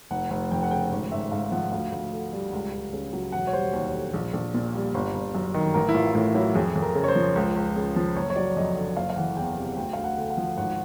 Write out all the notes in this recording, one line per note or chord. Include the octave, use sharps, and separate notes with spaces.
F1 F#5
F1 F#5
F2 G5
F#5
C#3 G5
G#1
G#1 E5
G#2 F5
F3 F#5
D2 F5
D2
D3
G3
C#2
C#2
C#3
F#3
E1 F#5
C#5
G3 C5
D#2
D3
A#1
A#1
A#2
G3
G1
G1
F#2
D#3
A1 A#4
E4
A1 F4
A2 E4
F#3 E4
F2 G#4
F2
A#4
C#3
C#5
C5
F3
C#2
C#2
C#3
F3
F#1 C#5
C#5
F#3 D5
F2 D#5
D3
F#1 F5
F5
E3 F#5
E2 G5
C3
D2 G5
D2 F5
F#5
D3
F#5
F3
G#1 F#5